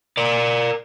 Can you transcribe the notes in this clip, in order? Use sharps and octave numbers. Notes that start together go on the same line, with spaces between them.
A#4 D5